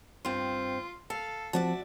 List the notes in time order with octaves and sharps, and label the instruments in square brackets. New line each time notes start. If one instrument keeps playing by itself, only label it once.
[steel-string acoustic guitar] G2 C4 [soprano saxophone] F4
[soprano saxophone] A4 [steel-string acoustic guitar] F5
[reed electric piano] F3 C4 A5 [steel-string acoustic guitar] F#4 D5 E5